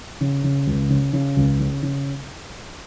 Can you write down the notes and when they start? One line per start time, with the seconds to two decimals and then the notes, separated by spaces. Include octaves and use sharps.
0.21 C#3
0.44 C#3
0.67 C#2
0.90 C#3
1.13 C#3
1.36 C#2
1.60 C#3
1.83 C#3